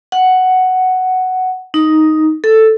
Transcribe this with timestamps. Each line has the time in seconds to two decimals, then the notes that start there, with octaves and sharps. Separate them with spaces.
0.12 F#5
1.74 D#4
2.44 A4